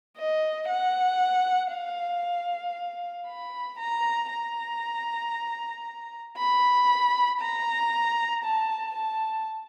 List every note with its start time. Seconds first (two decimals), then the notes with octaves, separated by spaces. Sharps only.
0.17 D#5
0.69 F#5
1.73 F5
3.28 B5
3.79 A#5
4.31 A#5
6.38 B5
7.41 A#5
8.45 A5
8.96 A5